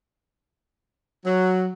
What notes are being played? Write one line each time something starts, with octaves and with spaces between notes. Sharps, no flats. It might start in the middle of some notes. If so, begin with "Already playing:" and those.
F#3